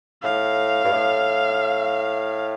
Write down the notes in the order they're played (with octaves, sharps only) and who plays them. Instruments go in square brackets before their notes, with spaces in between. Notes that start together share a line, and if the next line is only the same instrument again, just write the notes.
[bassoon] A2 [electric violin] F5
[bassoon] G2
A2